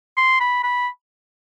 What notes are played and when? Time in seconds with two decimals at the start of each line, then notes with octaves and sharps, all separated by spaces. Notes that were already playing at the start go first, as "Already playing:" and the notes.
0.17 C6
0.40 B5
0.63 B5